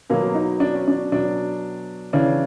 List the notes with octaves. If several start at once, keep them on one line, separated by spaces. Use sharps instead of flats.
B2 F#3 A#3
D#4
D4
C#4
D4
B2 F#3 D4
C#3 E3 D4